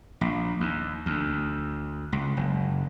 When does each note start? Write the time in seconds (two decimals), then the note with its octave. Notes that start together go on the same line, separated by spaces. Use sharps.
0.21 A#1
0.60 D#2
1.06 D2
2.12 C#2
2.37 F#1